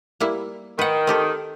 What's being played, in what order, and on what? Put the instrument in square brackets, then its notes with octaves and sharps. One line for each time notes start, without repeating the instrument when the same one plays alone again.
[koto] G3 A#3 E4
[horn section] D#3 [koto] B4 F#5
[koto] C4 G4 A4